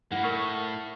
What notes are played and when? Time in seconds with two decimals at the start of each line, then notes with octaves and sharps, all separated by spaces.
0.11 C#2 A#3 E4 F#5
0.23 A2 A#4 C#6 F6